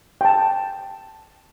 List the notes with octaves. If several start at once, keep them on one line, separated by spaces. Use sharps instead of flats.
G5 A5